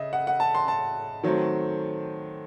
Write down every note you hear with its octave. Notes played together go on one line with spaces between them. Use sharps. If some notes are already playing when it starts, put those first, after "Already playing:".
Already playing: C#3 D#5 E5
F#5
F#5
A5
C6
A5
D#3 F#3 A3 C4